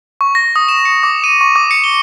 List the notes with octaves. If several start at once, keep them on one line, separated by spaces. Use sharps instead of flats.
C#6
A#6
D#6
E7
C#7
D6
D#7
C#6
D6
C#7
G7